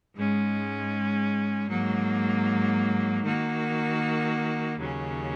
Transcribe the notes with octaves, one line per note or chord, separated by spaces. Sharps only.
G#2 G#3 C#4
G#2 F#3 A#3
D#3 A#3 F#4
D#2 C#3 F#3 C#4